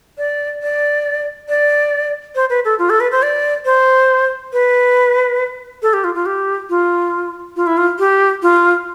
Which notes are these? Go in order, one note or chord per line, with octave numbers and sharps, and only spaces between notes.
D5
D5
D5
C5
B4
A4
F4
A4
B4
C5
D5
C5
B4
A4
G4
F4
F4
G4
F4
F4
E4
F4
G4
F4